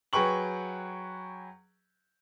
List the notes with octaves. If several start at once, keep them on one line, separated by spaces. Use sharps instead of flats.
F#3 G#4 B4 G5 C#6 F#7